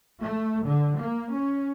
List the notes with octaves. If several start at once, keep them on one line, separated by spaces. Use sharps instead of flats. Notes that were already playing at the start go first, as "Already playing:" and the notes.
A3
D3
A#3
C#4